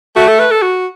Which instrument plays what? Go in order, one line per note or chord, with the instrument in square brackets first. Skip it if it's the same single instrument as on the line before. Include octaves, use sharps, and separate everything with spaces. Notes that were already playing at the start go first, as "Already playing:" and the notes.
[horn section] A3 [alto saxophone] F#4
[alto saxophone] A4
B4
A4
F#4